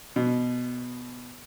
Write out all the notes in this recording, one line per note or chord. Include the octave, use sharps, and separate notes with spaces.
B2